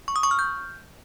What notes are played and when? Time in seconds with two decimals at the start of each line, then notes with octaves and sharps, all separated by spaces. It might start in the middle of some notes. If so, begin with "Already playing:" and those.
0.08 C#6
0.16 D#6
0.23 C#6
0.31 F6
0.39 G6